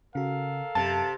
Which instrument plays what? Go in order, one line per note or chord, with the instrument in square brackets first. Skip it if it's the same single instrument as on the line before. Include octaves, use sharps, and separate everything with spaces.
[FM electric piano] C#3 F#4 [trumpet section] A4 A#4 F5
[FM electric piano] F#2 [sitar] C3 [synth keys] A5